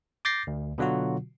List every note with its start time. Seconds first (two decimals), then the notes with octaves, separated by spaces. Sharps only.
0.25 D6 G6 A6 A#6 C7
0.47 D2
0.78 B2 D3 F#3 F4 F#4